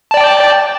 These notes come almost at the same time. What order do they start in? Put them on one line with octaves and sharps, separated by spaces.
A5 D5 G5